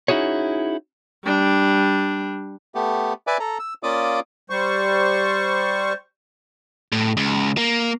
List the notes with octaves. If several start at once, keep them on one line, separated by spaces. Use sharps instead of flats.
C#4 D#4 E4 F#4 G#4 C#5
G3 D4
A3 B3 G4
B4 D5 E5 G#5 D6
A4 A#5
E6
A#3 C#4 F4 D5 D6 D#6
G3 C5 C#6
A2
C#2
A#3